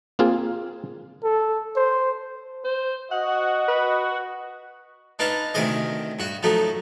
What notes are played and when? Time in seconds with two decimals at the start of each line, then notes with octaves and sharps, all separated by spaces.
0.19 A#3 C4 F4 G#4
1.24 A4
1.76 C5
2.64 C5
3.11 F#4 D#5 F#5
3.68 B4
5.19 D4 D#4 B4 F5 A5
5.54 D2 C3 D#3 G#4 D#5
6.19 G2 F#4
6.43 F3 F#3 A3 D#4